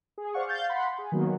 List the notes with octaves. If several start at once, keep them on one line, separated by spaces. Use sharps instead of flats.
G#4
C5 D5 F5 F#5 C#6
F5 G6 A6
F#5 B5 C6
G#4
D#3 F#3 A#3 B3